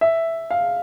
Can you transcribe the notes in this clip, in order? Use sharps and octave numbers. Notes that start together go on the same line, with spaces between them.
E5
F5